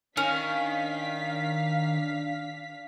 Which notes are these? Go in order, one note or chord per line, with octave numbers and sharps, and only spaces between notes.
D#3 C#4 D4 F5 B6